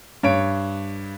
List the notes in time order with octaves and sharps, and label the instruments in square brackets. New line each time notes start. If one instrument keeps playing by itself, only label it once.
[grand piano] G2 C#5 D7